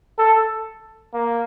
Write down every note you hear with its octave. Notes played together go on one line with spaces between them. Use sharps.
A4
A#3